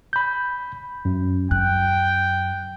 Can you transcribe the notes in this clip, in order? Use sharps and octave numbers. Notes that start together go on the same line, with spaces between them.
B5 G6
F#2
F#2 G5 F#6